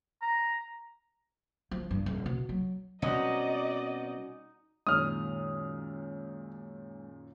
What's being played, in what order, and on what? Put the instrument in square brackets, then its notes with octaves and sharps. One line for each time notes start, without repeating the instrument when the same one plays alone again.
[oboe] A#5
[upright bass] F3
G2
D#1
B2
F#3
[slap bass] B2 G3 C4 [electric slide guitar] C#4 F#4 [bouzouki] D#4 [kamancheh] D5 D#5
[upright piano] F#2 A#2 D#3 [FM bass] G#3 [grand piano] D#6 F6